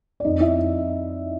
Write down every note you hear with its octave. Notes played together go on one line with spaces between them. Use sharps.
D5
F2 D#4 D#5
E4 E5